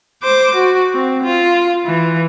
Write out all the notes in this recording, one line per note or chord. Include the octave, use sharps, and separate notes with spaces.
C5 D6
F#4
C4
F4
E3